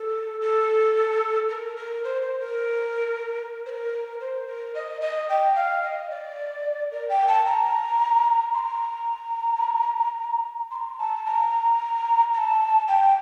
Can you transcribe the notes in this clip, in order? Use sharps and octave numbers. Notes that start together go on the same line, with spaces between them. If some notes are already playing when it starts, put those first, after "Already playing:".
Already playing: A4
A4
A#4
A#4
C5
C5
A#4
C5
A#4
C5
A#4
D#5
D#5
G5
F5
D#5
D5
A#4
G5
A5
A#5
C6
A#5
C6
A#5
A5
A#5
A#5
A5
G5